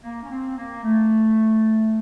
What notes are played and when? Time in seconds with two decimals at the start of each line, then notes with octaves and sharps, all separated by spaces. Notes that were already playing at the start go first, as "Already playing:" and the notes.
0.03 A#3
0.23 C#4
0.30 C4
0.58 A#3
0.84 A3